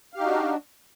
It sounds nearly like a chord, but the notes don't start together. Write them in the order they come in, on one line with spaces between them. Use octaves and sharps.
F5 G4 D#4 F#4 D4